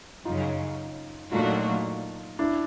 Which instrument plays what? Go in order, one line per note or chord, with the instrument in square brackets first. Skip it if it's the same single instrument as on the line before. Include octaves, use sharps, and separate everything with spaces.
[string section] F#2 C#3 F#3 [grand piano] D#4 F4
[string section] A#2 F#3 A3 D4 F#4 [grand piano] D#4 F4
[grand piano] D4 E4